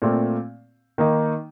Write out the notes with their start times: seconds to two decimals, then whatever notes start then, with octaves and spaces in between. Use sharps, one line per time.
0.02 A#2 A3 C4 F4
0.98 D#3 A#3 D#4